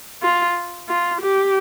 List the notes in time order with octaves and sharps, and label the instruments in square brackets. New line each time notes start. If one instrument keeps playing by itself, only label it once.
[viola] F4
F4
G4